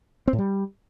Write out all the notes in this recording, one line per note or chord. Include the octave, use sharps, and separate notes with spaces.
C4
A2
G3